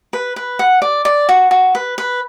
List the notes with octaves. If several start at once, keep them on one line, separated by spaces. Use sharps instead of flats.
B4
B4
F#5
D5
D5
F#4
F#4
B4
B4